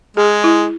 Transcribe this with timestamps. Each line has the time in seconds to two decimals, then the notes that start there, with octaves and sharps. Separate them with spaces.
0.17 G#3 G#4
0.44 E4